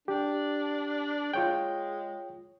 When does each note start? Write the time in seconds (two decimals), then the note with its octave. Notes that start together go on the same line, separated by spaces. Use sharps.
0.08 D4 G4
1.34 G#3 F4 C#5 G5